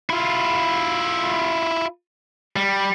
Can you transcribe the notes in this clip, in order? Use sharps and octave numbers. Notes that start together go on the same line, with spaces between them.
E4 F4
G3